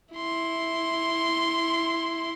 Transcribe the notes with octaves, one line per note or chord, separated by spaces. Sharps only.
E4 C6